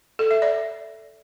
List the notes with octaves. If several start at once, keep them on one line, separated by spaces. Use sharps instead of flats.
A4
E5
D5